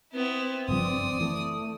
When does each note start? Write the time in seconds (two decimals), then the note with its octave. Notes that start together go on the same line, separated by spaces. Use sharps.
0.13 B3 C4 E4
0.69 F#1 G2 F3 D5 D#6
1.21 E3 A3